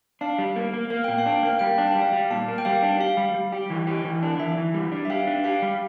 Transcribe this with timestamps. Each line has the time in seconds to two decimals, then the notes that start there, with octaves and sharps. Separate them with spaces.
0.21 D4 F5
0.38 G3
0.56 A#3
0.74 A#3
0.90 A#3 F5
1.04 A#2 G5
1.18 F5
1.26 D4
1.32 G5
1.43 A#3 F5
1.59 G3 G5
1.73 D4 F5
1.87 G5
1.95 G3
2.01 F5
2.13 G3
2.31 A#2 A5
2.48 A#3
2.58 G5
2.65 G3 F5
2.83 D4
3.00 G4 F5
3.17 G3
3.34 G3
3.52 G4
3.70 E3
3.87 G4
4.04 E3
4.22 D4
4.40 E3 E5
4.57 E3
4.74 G3
4.92 D4
5.05 E5
5.10 G4 F5
5.27 D4
5.44 G4 F5
5.62 G3